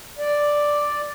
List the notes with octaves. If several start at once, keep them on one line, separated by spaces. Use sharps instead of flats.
D5